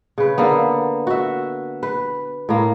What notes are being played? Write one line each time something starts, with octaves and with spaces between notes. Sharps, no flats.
C#3 B4
D3 A#3 B3
F#4 E5
B4
A2 A#3